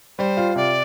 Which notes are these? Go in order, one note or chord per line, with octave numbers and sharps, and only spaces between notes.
G3 C5
F4
C3 D5